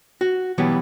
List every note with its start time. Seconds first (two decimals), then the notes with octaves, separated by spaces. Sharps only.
0.21 F#4
0.58 B2 E3 F#3 G3 B3